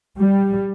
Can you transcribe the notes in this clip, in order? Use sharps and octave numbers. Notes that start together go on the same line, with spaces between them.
G3